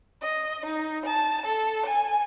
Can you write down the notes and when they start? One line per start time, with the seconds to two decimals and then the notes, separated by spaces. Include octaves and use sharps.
0.21 D#5
0.64 D#4
1.04 A5
1.45 A4
1.84 G#5